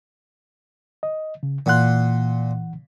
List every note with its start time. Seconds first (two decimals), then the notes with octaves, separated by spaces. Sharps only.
1.03 D#5
1.43 C#3
1.66 A#2 E3 F#5 C6 F#6